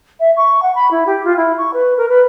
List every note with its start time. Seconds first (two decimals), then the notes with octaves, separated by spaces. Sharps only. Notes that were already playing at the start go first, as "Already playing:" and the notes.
0.20 E5
0.37 C#6
0.63 F#5
0.75 B5
0.91 E4
1.06 G4
1.25 F4
1.37 E4
1.58 C#6
1.74 B4
1.97 A#4
2.09 B4